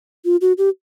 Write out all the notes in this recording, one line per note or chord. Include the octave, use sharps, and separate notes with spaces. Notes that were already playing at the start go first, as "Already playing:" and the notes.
F4
F#4
G4